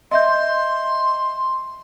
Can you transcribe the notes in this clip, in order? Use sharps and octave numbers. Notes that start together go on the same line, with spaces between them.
D#5 E5 C6 G6